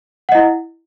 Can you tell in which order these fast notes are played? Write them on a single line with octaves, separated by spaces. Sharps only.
F#5 D#5 E4